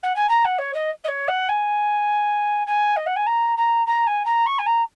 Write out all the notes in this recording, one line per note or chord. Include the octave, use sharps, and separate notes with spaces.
F#5
G#5
A#5
F#5
C#5
D#5
D#5
C#5
F#5
G#5
G#5
D#5
F#5
G#5
A#5
A#5
A#5
G#5
A#5
C#6
G#5
A#5